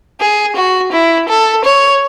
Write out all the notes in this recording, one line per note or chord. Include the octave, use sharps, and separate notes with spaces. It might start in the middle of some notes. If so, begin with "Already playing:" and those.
G#4
F#4
E4
A4
C#5